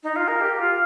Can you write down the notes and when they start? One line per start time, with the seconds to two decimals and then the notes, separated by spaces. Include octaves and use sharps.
0.03 D#4
0.16 F4
0.28 A#4
0.41 G4
0.59 F4